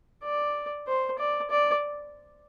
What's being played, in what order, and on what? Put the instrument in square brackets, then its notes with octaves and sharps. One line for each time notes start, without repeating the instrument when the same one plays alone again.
[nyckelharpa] D5
C5
D5
D5